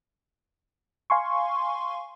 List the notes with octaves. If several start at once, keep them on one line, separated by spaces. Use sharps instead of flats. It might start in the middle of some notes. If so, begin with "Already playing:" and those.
F5 G#5 C6 C#6